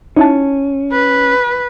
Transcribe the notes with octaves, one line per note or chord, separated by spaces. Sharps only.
C#4 D#4 E4 A5
B4